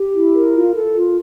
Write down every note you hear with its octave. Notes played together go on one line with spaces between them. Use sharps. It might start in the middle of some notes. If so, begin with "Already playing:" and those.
Already playing: G4
E4
A#4
F4
A4
F4